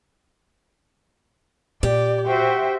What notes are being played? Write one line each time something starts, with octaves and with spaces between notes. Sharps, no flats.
A#2 G4 D5
F#4 C5 E5 G5